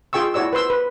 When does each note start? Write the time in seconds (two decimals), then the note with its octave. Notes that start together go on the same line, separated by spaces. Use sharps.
0.13 F4 G#4 G5 C#6 E6
0.34 E4 F#4 C#5 D5 E6
0.53 B4 C5 C6 E6
0.70 B4